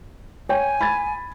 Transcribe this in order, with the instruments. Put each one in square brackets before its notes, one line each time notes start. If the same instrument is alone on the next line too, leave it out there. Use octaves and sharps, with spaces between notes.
[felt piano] C#5 G5 [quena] G#5
[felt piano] B5 G#6 A6